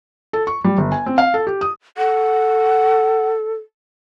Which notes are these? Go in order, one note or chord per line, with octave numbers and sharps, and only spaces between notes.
A4
C#6
G3
G1
G#5
C4
F5
A4
G4
D#6
A4 F#5